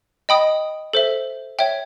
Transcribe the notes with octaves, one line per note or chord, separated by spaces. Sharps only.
D#5 G5 B5 D#6
A4 C5 E5
C#5 E5 G5